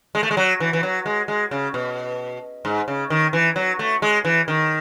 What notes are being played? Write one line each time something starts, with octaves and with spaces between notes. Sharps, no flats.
G#3
A3
G#3
F#3
E3
E3
F#3
G#3
G#3
C#3
B2
G#2
C#3
D#3
E3
F#3
A3
G#3
E3
D#3